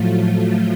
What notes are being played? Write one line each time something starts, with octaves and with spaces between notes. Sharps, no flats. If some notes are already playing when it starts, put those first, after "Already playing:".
Already playing: A2 F3 F#3 A3 F4